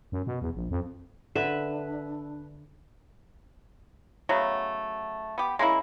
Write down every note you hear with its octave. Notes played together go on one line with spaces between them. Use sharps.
F#2
B2
E2
A#1
F2
D3 D4 B4 E5
C#3 F#3 A3 B3
B3 G4
G#3 A#3 C#4 E4